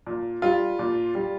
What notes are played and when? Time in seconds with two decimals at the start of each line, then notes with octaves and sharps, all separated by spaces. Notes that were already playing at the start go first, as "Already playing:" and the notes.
0.07 A#2
0.42 G3 F4
0.79 A#2
1.15 G3